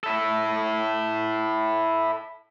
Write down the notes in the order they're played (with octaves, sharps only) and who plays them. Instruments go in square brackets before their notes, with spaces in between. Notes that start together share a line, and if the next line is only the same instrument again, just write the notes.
[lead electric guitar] E4 A4